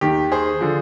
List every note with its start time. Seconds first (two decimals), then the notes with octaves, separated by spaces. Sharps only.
0.01 D#2 D#3 G4
0.32 G#4 C5
0.61 D3 F3